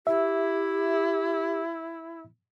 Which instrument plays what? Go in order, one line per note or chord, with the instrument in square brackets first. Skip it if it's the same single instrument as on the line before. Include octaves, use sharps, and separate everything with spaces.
[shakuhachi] E4 [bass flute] G4 [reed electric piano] E5